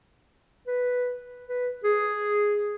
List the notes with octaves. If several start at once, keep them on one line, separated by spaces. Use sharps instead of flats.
B4
B4
G#4